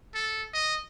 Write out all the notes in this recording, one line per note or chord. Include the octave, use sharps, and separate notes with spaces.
A4
D#5